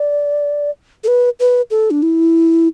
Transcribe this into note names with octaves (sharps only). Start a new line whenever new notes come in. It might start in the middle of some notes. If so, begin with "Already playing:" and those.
Already playing: D5
A4
B4
B4
A4
D4
E4